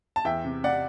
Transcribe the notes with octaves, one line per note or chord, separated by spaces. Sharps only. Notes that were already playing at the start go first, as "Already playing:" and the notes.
A5
E2 E5 G5
C3
C3 D5 F#5